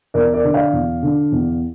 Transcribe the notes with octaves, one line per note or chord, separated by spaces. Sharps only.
E2 A#4 D5
A#4 D5
D3
D5 F5
E2
D3
E2